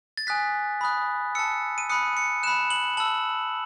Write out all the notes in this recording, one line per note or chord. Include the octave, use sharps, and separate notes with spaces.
A6
G#5 D#6 F#6 B6
B5 D#6 F#6
A5 E6 C#7
D#7
B5 D#6 F#6 C#7
C#7
B5 F#6 E7
F#7
A5 E6 F#7